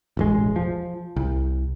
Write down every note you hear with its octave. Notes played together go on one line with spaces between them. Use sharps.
E1 A1 G#3
F3
C2